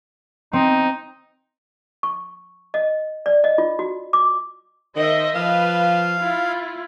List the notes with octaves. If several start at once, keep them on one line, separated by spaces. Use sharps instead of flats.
C4 D#4
C#6
D#5
D5
D#5
F4
F#4
D6
D#3 C5 D#5 E5
F3 B4 F5
E4 F4